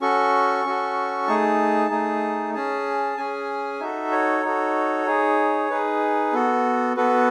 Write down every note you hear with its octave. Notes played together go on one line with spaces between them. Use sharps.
C#4 F#4 A4 C#6
C#4 F#4 A4
A3 D#4 G#4 A5
A3 D#4 G#4
C#4 G#4 A5
C#4 G#4 G#5
D#4 F#4 A4 E5
C#5
D#4 F#4 A4
D#4 G#4
D#4 G#4 B4
B3 F#4 A4
B3 F#4 A4 B4